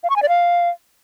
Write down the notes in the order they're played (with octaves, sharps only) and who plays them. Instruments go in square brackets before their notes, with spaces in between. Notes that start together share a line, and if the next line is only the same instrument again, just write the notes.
[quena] F5
C#6
G#5
D5
F5